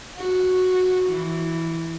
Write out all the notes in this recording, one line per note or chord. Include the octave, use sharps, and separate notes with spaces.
F#4
E3